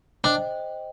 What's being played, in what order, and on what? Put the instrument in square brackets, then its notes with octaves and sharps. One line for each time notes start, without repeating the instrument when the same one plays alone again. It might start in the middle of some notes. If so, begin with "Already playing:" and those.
[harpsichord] D4 [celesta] C5 D#5 G5